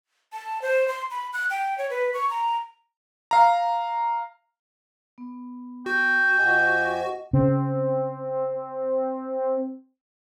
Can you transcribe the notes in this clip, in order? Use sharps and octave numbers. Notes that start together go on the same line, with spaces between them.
A5
C5
C6
B5
F#6
G5
C#5
B4
C#6
A#5
F5 A#5
B3
F#4 G5
F2 G4 D#5 F#5 G#5
C#3 C4